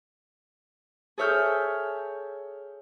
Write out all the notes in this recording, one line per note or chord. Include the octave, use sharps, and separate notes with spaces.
G#4 A4 C#5 E5 F6 G6